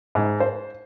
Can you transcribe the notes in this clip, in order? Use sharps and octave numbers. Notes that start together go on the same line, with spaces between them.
G#2
C5